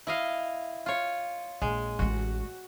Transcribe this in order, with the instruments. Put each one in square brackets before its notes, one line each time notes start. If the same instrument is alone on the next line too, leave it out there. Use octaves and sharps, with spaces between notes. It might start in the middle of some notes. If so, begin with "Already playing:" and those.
[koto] E4 D#5 F5
F4 C#5
[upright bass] A#1 [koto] G#3
[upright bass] A1 G#3 [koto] F#4